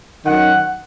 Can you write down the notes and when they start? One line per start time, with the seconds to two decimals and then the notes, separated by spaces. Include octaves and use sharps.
0.25 F#2 D#3 F#3 F#5